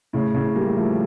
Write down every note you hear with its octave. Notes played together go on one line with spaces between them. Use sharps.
A2 C#3
A2 C#3
G3 A#3
F3 A3